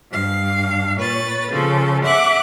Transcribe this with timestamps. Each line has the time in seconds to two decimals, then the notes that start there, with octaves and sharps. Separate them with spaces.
0.10 G2 F5
0.97 A#2 B4 C#5 A6
1.51 C#3 F3 A4
2.04 E5 F#5 D6 F#6